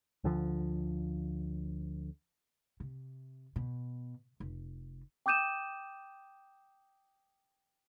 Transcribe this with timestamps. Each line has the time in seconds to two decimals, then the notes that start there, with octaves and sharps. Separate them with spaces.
0.24 D2 D3 F3
2.80 C3
3.56 B2
4.40 F1
5.26 G5 D6 D#6 G6 D#7 E7